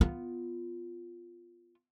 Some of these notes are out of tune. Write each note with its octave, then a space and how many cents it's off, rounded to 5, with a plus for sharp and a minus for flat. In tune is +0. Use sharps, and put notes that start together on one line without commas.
B3 +10 F4 +0